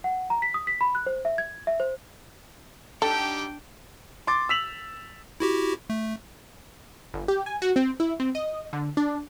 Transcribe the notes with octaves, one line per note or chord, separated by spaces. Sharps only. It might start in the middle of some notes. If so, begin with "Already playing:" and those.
F#5
A#5
B6
D#6
B6
B5
F#6
C5
E5
G#6
E5
C5
G3 D4 D#4 G4 A4 F#5 G5
C6 D6 A6
E6 B6 F7 F#7
E4 F#4 G4
A3
G1
G4
G#5
F#4
C4
E4
C4
D#5
D3
D4